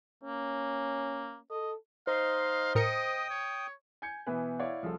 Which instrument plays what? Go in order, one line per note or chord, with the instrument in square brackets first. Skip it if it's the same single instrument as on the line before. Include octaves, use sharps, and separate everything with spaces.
[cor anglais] A#3 [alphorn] C#4
[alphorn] A4 [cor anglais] D#5
[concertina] D#4 D#5 C6 [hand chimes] C5 [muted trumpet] F5
[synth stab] A2 A#4 C#7 [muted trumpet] D#5 [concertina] G5 D#6
[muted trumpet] C#5
[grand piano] G#5 G6 G#6 C#7
B2 E3 B3 B4 G#5
E4 C#5 D5 F5 F#5
C2 F3 G#4 A4